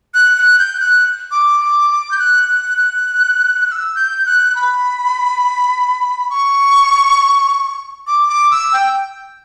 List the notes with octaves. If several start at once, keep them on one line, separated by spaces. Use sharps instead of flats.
F#6
F#6
G6
F#6
D6
D6
D6
G6
F#6
F#6
F#6
F#6
E6
G6
F#6
B5
C#6
D6
D6
E6
G5